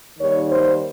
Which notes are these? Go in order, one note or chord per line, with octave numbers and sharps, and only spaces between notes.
D#2 D#3 G3 C#5
C5